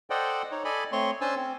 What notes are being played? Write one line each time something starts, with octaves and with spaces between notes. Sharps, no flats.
A4 C5 D5 D#5 F#5 G5
D#4 C#5
A4 D5 D#5 G#5 B5
A3 C4 C#5 C6 C#6
C#4 D4 C5 G#5 A5 E6
C4